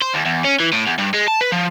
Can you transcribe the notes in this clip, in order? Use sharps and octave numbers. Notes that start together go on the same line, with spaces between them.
C5
D#2
E2
C#4
E3
A2
E2
G2
G#3
A5
B4
F3